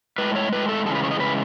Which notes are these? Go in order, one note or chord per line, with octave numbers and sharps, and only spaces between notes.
A2 G#3 B4
C#5
A2 G#3 B4
A4
C#3 E3 G#3 A4
B4
C#5
D#5
C#3 E3 G#3 B4